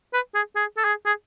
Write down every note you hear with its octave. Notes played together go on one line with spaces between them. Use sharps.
B4
G#4
G#4
A4
G#4
G#4